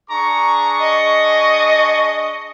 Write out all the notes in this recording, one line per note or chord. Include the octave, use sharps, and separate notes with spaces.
D4 G#4 A#5 C#6
D#5